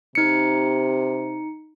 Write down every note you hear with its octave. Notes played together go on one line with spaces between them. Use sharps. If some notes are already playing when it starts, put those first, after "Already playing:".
C3 D#4 C#7